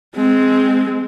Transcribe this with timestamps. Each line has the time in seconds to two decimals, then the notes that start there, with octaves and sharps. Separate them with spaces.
0.15 G#3 C4